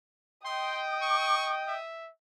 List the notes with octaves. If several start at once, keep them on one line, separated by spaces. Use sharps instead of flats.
D#5 G5 C6 D#6
C#6
E5